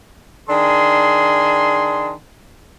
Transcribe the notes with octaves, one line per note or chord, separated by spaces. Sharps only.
D#3 D4 G#4 C6